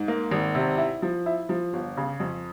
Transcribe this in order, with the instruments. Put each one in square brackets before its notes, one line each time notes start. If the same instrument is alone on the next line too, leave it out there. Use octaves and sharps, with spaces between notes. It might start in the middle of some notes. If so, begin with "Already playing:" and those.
Already playing: [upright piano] G#2
A#3
G#1
C3
E4
F3
E4
F3
G1
C#3
F2